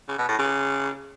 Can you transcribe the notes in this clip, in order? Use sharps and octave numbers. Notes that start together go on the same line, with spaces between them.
C#3
B2
A2
C#3